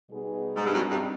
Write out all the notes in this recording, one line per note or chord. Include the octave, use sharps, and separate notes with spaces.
B2 G3 B3 D#4 G#4
G#2
G2
F#2 G3 C4 D#4
G2